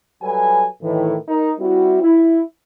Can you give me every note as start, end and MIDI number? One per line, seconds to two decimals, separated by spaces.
0.22 0.65 54
0.22 0.65 55
0.22 0.65 69
0.22 0.65 71
0.22 0.65 80
0.83 1.15 45
0.83 1.15 51
0.83 1.15 52
1.28 1.51 63
1.28 1.51 70
1.59 1.99 55
1.59 1.99 60
1.59 1.99 64
1.59 1.99 66
2.02 2.41 64